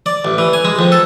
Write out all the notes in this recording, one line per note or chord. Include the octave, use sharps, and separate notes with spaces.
D5
A1
E3
G#5
G#3
F2
A4